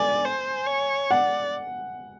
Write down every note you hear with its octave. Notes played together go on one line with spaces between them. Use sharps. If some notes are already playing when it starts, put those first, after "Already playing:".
Already playing: D5 G#5
C5
C#5
D5 F#5